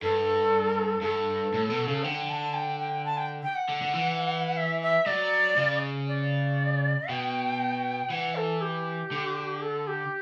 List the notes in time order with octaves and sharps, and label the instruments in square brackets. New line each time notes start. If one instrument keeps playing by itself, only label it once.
[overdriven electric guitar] G2 [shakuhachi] A4
[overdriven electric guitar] G2 [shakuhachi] A4
[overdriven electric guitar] A2
B2
C#3
[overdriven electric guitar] D3 [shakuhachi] G5
[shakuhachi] A5
G5
G5
A5
G5
G5
F#5
[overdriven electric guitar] D3
D3
E3
[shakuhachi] E5
E5
[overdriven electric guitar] F#3 [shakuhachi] D5
[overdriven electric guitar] C#3
[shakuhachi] D5
[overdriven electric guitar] B2 [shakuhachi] G5
[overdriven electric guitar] E3 [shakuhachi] F#5
[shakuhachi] A4
G4
[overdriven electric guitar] D3
[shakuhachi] A4
G4